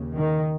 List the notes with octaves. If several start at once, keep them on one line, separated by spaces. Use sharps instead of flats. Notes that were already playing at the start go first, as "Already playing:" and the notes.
Already playing: D#2 C#3
D#3